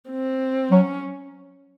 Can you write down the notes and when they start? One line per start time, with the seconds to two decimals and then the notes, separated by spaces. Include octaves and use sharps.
0.09 C4
0.71 F#3 C#4